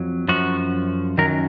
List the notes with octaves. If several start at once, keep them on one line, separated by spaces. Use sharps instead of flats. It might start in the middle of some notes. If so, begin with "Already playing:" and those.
Already playing: F2 F#3
F#2 F3 F#4
F#2 D#3 F#3 A#4